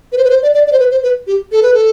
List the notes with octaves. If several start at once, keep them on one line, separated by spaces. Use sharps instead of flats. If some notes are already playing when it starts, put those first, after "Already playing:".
B4
C5
B4
C5
D5
D5
D5
C5
B4
C5
B4
G4
A4
B4
A4